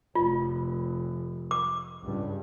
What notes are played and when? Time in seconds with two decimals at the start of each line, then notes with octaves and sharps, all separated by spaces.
0.15 F1 F4
1.51 D6
2.03 C#2 G2